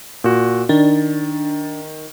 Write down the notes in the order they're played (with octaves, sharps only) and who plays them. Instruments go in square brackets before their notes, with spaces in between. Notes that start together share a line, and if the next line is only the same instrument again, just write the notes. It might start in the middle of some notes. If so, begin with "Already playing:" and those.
[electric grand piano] A#2 F#4
[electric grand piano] D#3 [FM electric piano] D4